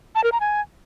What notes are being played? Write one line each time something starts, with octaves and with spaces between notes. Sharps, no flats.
A5
A#4
A#5
G#5